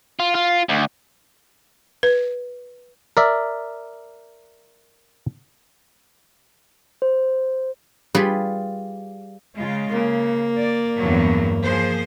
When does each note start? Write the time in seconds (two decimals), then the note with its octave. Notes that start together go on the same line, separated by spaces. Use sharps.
0.20 F4
0.35 F4
0.69 D2
2.03 B4
3.17 A#4 D5 E5
7.02 C5
8.15 G3 F4 G#4 B4
9.56 C#3 G#3 F4
9.90 C#3 A#3
10.56 D5
10.99 E2 G2 F#3
11.66 F3 G#4 C5